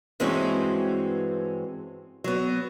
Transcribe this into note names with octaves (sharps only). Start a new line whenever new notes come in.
G2 E3 G#3 C4 C#4 F#4
F#3 B3